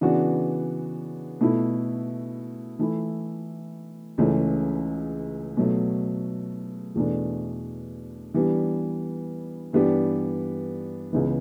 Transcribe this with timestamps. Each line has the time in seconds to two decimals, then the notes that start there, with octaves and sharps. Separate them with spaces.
0.01 C#3 E3 B3 D4 F#4
1.41 B2 A3 E4 A4
2.79 E3 A3 E4
4.18 C#2 C#3 E3 A3 C#4
5.57 B2 F#3 A3
6.95 E2 B2 A3 D4 A4
8.34 E3 G3 B3 D4
9.73 G2 E3 B3 D4 G4
11.13 C#2 C#3 E3 B3